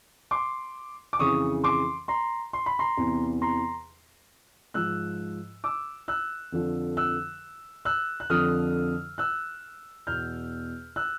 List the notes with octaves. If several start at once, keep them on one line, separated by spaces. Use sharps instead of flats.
C6 D6
D6
F2 C#3 E3 C#6 D#6
C6 D6
A#5 C6
C6
B5
A#5 C6
E2 C3 E3
A#5 C6
G#2 F3 E6 F#6
D6 E6
E6 F#6
F2 D3 F3
E6 F#6
E6 F#6
F#6
F2 D3 F3 D#6 F6
E6 F#6
E2 B2 F6 G6
E6 F#6